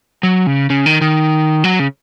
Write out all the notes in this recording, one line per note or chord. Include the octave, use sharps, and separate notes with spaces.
F#3
C#3
C#3
D#3
D#3
F#3
C#3